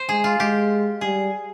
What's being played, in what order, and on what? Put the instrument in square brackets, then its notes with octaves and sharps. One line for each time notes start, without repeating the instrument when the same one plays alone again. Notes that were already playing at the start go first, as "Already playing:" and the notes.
Already playing: [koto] C5
[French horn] G#3 [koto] G#4
[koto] F4
[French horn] G#3 [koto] G4
[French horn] G3 [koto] G#4